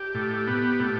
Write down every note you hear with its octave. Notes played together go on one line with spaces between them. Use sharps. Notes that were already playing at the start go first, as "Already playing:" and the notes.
Already playing: G4
A2
B3
A2